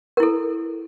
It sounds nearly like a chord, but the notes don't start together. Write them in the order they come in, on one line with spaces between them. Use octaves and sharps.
A#4 E4 A4